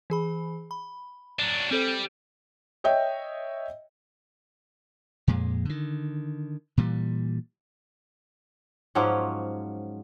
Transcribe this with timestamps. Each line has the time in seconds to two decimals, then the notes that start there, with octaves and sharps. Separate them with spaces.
0.10 E3 G#4 B5
0.71 B5
1.39 F#3 D4
1.71 G3 C4 A4 C5
2.84 C#5 D#5 E5 G5
5.28 F2 A#2 G#3
5.65 D3 D#3
6.77 A#2 E3 G3
8.95 G#2 F3 F#3 C#4